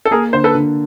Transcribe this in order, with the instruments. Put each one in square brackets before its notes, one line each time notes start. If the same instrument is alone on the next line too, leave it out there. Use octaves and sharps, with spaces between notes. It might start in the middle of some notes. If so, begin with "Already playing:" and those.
[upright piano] A4
[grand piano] A#3 [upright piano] G#4 A#4
[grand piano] D3 [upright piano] C5
[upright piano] A4 B4
[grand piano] D3